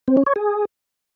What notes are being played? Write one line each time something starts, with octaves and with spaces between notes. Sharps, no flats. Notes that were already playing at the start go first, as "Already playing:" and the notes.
C4
C#4
C#5
G#4